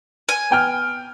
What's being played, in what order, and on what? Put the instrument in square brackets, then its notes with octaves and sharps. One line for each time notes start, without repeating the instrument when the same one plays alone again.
[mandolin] G#5
[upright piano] B3 G5 F6